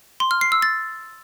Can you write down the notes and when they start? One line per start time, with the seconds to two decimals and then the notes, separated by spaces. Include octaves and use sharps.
0.20 C6
0.31 F6
0.41 C7
0.52 E6
0.62 A6